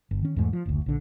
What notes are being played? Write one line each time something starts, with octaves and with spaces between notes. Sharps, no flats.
G1
D#3 C#4
E2 G#2 A3
F3
F#1 D2
A#1 D3